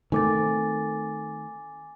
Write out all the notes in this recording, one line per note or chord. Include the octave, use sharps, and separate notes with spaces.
D#3 A3 C4 G#5 D6 A6